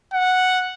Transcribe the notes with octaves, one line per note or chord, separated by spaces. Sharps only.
F#5